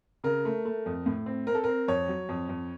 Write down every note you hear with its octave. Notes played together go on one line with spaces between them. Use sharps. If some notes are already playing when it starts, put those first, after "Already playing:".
C#3 A#4
A3
A3
F2
A2
C4
C4 A#4
A4
C4 A#4
F2 C#5
F#3
F2
F2